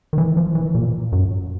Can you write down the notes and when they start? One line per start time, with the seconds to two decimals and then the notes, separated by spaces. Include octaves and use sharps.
0.13 D#3
0.18 E3
0.37 F3
0.55 E3
0.75 A#2
1.12 F#2